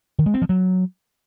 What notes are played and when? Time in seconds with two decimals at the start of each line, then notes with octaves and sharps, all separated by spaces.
0.19 D#3
0.26 G#3
0.34 C4
0.42 F3
0.49 F#3